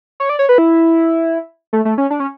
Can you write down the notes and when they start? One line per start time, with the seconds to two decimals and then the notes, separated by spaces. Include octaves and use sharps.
0.20 C#5
0.29 D5
0.39 C#5
0.49 B4
0.58 E4
1.73 A3
1.85 A3
1.98 C#4
2.10 D4
2.20 C#4